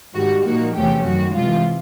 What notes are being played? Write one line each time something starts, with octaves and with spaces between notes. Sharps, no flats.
G#2 D#3 G3 F#4
A#2 F3 A#3 D#4 F#4
E2 C3 F3 A3 C#4 G4
F#2 D#3 F#3 F#4
C3 E3 G#3 F4